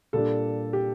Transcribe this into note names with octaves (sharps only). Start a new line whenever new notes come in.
A#2 G3 D4 A4
G4